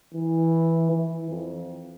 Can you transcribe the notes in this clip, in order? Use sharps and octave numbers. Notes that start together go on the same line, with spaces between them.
E3
E3
F2